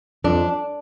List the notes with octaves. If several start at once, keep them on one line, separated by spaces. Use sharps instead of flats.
F2 D4